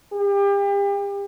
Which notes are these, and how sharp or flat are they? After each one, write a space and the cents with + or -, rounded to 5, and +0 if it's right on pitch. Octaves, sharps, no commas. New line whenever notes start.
G4 +35